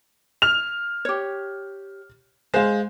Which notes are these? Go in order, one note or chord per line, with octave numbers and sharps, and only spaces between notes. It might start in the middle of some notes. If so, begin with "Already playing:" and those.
F6 F7
G4 C#5
G#3 C5 F5